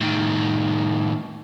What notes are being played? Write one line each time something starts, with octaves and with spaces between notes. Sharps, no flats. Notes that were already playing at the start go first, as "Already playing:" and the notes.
A2 D#3